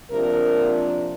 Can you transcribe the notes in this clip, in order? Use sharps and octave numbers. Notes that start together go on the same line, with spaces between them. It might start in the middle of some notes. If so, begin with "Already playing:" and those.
C3 F3 A#3 D4 A#4